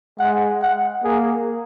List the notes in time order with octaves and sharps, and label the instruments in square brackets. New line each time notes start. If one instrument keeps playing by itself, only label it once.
[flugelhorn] G#3 [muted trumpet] F#5
[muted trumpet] F#5
[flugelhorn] A#3 [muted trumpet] G#4